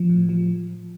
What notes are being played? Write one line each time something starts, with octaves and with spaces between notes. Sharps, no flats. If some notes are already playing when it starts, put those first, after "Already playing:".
Already playing: F3
A2
F3